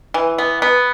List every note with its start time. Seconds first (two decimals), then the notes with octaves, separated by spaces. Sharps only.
0.14 E3
0.38 B3
0.62 B3